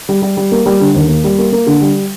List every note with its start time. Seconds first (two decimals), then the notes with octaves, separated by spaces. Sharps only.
0.09 G3
0.22 G3
0.37 G3
0.52 A#3
0.66 G3
0.80 D3
0.95 D#2
1.09 A#3
1.24 G3
1.38 A#3
1.52 A#3
1.67 D3
1.81 G3